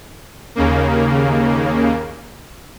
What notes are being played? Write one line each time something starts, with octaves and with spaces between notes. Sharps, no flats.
D#2 C#3 A#3